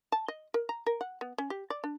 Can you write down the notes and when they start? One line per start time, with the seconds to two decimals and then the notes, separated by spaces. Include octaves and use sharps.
0.12 A5
0.28 D#5
0.54 A#4
0.69 A#5
0.86 A#4
1.01 F#5
1.21 B3
1.38 C#4
1.50 G4
1.70 D5
1.84 D4